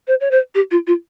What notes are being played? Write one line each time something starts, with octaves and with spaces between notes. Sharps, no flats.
C5
C#5
C5
G4
F4
F4